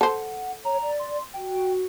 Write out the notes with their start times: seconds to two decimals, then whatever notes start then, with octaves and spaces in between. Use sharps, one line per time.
0.01 A4 C5 F#5
0.65 C#5 A#5
0.80 D5
0.99 C6
1.34 F#4 G5